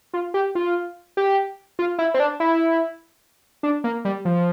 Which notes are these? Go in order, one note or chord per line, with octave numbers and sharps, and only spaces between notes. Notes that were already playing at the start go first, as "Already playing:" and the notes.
F4
G4
F4
G4
F4
E4
C4
D4
E4
D4
A#3
G3
F3